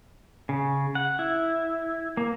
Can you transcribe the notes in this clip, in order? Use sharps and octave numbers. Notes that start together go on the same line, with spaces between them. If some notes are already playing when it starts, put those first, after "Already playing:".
C#3
F#5
E4
A#3